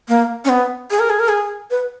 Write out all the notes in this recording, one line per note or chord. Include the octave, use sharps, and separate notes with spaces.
A#3
C#4
B3
G#4
A#4
G#4
A#4
G#4
B4